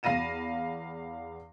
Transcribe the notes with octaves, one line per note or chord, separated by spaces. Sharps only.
E2 F5 B5 A#6 D#7 E7